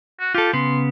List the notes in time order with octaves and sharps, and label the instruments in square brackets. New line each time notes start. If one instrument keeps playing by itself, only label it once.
[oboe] F#4
[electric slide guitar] F4 A4 [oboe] G4
[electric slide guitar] C#3 B3 [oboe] C6